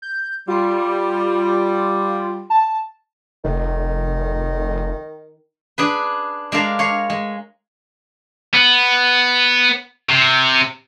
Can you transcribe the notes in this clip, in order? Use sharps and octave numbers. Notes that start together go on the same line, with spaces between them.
G6
G3 F4
A5
F1 D#3
D4 G#4 B4
G#3 D4 A#4 F5 A5
C#5 F5
G#3
B3
C3